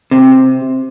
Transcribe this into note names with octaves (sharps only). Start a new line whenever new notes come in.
C3